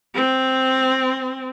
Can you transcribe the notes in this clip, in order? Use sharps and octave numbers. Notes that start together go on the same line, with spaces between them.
C4